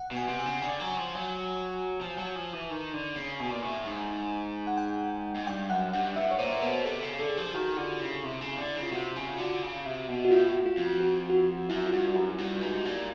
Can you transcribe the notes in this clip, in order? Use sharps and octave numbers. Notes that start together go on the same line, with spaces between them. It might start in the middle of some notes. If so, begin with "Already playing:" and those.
Already playing: F#5
B2
G#5
C3
G5
C#3
D3 G#5
F#3
F3
F#3
F3 A5
G#5
F#3 A5
F3
E3
D#3
D3
C#3
B2 G#5
A#2
A2
G#2
F#5
G5
G#2
G2 G5
F#2 F#5
G2 F#5
A2 E5
C#5
A#2 C5
B4
B2 A#4
C3 A4
C#3
D3 A4
G#4
F3 G4
G#4
D#3 F#4
D3 F4
C#3 E4
C3
C#3
D3
C#3
F4
C3 F#4
C#3
D3
C#3
C3
B2
F#4
A2 F4
F4
F2
F#4
F#4
F4
F#2 E4
F4
G2 F#4
F#4
F#2 G4
G2
G#2
A#2